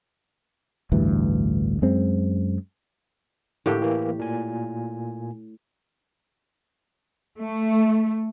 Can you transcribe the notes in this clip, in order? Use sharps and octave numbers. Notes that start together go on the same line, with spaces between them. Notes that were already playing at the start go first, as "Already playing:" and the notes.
A1 D2 G2 E3
F#2 G#3 C4
A2 D3 A#3 G4 A4
E3 A#3
A#2 G#5
A3